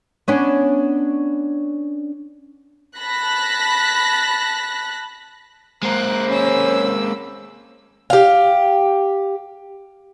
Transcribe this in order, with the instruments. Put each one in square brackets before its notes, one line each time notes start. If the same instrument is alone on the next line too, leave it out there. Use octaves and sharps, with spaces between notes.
[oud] B3 C#4 D4
[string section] A5 B5 F#6 A#6 B6
[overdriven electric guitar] G#3 A#3 [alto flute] C5 [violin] A#5 F#6
[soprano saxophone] C#4 [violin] B5 E6
[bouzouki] G4 F5